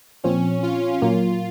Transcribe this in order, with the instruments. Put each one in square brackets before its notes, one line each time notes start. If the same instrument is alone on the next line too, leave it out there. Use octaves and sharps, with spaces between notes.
[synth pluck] A#2 F3 C4 [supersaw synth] C#4
[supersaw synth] F4
[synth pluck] A#2 F#3 A#3 [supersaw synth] F4